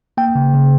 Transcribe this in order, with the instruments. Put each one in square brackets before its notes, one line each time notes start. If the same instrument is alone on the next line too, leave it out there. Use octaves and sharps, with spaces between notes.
[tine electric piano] A#3 G5
C#3
C#3